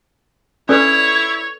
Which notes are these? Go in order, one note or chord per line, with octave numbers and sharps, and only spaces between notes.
C#4 E4 A4 B4 C#5 D5